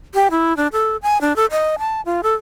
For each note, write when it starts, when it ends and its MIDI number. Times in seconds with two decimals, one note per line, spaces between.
0.14 0.28 67
0.31 0.55 64
0.57 0.67 62
0.72 0.97 69
1.03 1.20 80
1.21 1.35 62
1.36 1.45 69
1.51 1.75 75
1.79 2.01 81
2.05 2.21 65
2.23 2.34 69